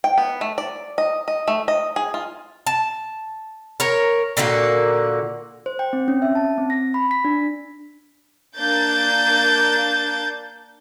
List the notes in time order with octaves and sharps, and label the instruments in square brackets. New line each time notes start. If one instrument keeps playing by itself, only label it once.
[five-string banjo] G5
B3
A3
D5
D#5
D#5
A3
D#5
G#4
F4
[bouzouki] A5
A#4 C#5
A#2 D3 A#3 F#4
[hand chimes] C5
G5
C4
C#4
E5
A5
C4
A#6
B5
B6
D4
[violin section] A#3 D4 G6 A6